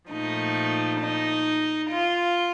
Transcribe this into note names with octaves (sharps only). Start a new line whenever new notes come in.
A#2 F3 A3 D#4
D#4
F4